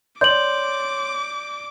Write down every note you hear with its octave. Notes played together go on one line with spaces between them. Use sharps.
C#5 D5 C6 D6 G6 F#7